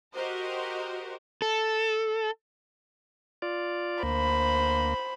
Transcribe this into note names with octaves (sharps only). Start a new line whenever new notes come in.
F#4 G4 A#4 C5 D#5
A4
F4 D5
D2 A#3 C5 B5